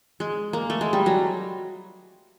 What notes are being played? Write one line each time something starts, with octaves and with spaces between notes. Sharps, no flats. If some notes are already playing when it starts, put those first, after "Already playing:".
G#3
A#3
A3
G#3
G3
F#3